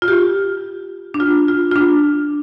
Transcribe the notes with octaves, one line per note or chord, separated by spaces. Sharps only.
F4
G4
D4
F4
F4
F4
D4